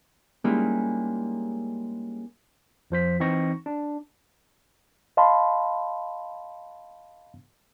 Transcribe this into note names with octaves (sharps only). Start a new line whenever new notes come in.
G3 G#3 A#3 C#4 D#4 E4
F2 F3 C5 B6
E3 C4 D#4 D#5 C#6 A#6
D4
D#5 F5 A5 B5 C6